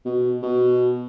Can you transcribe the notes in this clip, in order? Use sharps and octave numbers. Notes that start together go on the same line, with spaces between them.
B2
B2